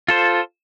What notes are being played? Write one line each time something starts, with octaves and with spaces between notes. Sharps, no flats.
F4 A4 C5